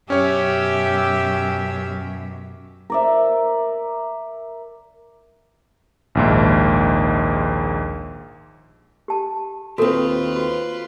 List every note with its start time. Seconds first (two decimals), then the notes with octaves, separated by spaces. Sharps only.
0.10 F#2 B2 C#4 G4 C#5 E5
2.90 A#4 D5 E5
6.15 A#1 D#2 G#2
9.08 G4 A5
9.78 D#2 C4 F4 F#4 A4 B4
10.36 F#4